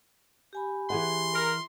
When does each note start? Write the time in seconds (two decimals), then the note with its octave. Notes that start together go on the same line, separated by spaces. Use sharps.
0.53 G4 G#5 B5
0.90 E3 G#4 F#5 C6
1.34 A#4